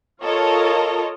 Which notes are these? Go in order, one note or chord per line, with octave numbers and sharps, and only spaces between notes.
F4 A4 A#4 C#5 D#5